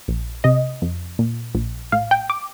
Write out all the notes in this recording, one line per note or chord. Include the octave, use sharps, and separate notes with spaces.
A#1
C3 D#5
F2
A#2
A#1
A2 F5
G5
D6